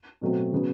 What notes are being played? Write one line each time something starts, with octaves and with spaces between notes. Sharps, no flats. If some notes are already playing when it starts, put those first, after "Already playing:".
B2 F#3 A3 C4
C#3 F#3 B3